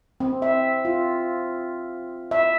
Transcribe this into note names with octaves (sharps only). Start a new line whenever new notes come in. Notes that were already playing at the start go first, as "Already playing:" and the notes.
C4
E5
F4
E5